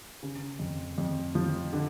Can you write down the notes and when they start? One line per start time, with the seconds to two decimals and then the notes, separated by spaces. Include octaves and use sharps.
0.23 C#3
0.59 F2
0.98 F2
1.35 F3
1.73 D3